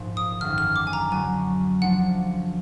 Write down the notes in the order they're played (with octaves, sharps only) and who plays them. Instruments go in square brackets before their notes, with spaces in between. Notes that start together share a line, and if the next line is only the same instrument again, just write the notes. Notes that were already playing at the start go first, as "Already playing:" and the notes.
Already playing: [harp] A#1 G#2 F3 G#3
[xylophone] D#6
[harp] G#1 F#2 D3 [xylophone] F6
[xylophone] F6
D6
G#5
A#5
[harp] D2 D3 F#3 [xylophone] G#5
[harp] D2 D3 F3 G#3 D4 [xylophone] F#5